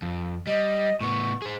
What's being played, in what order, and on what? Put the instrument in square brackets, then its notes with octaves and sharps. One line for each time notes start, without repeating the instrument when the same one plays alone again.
[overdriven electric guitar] F2
[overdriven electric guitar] G3 [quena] D#5
[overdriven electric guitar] A2 B3 [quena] C#6
[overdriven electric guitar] G#4 C5